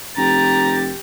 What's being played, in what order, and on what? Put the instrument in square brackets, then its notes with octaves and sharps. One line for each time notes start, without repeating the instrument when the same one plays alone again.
[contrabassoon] F1 [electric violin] G4 A6 [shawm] A#5